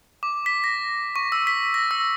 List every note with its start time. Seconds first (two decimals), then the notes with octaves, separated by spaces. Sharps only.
0.23 D6
0.46 B6
0.64 A#6
1.16 C#6
1.32 E6
1.47 B6
1.74 A#6
1.91 E6